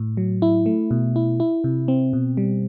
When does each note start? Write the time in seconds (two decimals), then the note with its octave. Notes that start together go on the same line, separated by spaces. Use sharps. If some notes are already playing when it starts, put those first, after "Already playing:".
Already playing: A2
0.17 F#3
0.42 E4
0.66 A3
0.91 B2
1.16 E4
1.40 E4
1.64 C3
1.88 C4
2.13 B2
2.37 G3